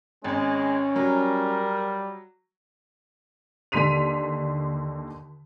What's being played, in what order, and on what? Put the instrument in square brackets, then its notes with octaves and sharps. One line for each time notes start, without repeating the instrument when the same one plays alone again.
[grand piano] G#1 [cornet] G#3 [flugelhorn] C#4
[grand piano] F#3 [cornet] G3 [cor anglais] A#4
[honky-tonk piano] D#2 D3 C6 B6 D#7 F7